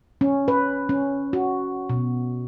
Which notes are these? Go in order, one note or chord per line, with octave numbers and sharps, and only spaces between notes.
C#4
B4
C#4
F#4
B2